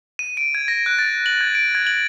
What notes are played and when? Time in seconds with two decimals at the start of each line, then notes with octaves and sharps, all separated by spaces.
0.19 D#7
0.37 D7
0.55 G#6
0.68 A#6
0.86 F#6
0.99 A6
1.26 F#7
1.41 G#6
1.55 D7
1.75 G#6
1.87 F#7